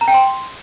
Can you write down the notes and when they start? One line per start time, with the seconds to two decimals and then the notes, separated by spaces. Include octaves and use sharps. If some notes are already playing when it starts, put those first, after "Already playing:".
0.01 A#5
0.08 G5
0.14 C6